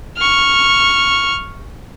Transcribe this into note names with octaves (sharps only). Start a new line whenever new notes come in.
C#6 F6